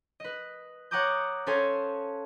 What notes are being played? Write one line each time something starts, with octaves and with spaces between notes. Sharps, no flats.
B4 D#5
C#5 F#5 A#5 D6 D#6 G6
C#4 A4 C5 C#5 F5 G#5